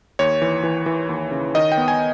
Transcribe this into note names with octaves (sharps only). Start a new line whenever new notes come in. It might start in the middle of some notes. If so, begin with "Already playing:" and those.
D#2 C#5
E3
E3
E3
D#2
C#3
D#3 D#5
G5
B3
G#5